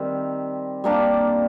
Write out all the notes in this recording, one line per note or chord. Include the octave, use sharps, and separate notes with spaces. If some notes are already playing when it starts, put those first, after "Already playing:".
Already playing: D#3 G3 C4
G3 A#3 D4 G4